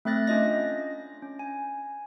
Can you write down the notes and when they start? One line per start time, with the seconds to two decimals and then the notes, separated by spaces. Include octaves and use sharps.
0.05 A3 C4 E5 F#6 A6 A#6
0.27 C#4 D4 F4 D#5 A#6
1.22 C#4
1.39 G#5